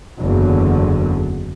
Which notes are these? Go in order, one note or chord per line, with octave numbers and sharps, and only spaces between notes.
F#1 E2 D3 F#3